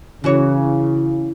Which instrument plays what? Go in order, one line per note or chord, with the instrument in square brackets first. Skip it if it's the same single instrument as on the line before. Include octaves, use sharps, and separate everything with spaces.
[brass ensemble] C#3 [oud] E3 F#4 C#5